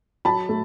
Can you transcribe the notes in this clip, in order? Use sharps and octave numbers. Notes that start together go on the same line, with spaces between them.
F#3 A5 B5
A3